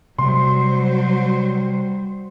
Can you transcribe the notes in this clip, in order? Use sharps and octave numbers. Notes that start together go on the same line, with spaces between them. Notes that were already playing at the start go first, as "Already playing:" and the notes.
C3 F#3 G3 A3 C5 C6